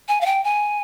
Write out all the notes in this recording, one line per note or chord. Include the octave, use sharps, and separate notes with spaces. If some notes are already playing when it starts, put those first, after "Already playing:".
G#5
F5
G5
G#5